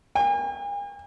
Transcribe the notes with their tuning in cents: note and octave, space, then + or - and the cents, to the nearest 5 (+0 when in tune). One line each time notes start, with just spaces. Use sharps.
G#5 -45